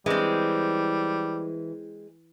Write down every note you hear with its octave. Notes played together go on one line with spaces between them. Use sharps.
E3 G3 G#3 C4